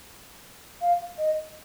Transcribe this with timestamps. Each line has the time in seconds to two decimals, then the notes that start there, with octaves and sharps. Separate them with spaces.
0.81 F5
1.19 D#5